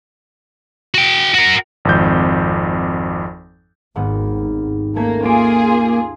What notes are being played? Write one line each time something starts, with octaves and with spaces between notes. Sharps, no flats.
F#4 G5
F#4 A#4
G#1 F2 G6
G#1 D#2 G#2 B3
A3 A#3 C#4 G#6
A#3 F4 G#4 G#5